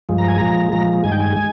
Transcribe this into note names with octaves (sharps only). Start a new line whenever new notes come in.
G2 F3 G#3
A#5
G#5
A#2 F3 G#3 A#5
A#2 F3 G#3 A#5
G2 D#3 G#3 G#5
G5
G#5
G#3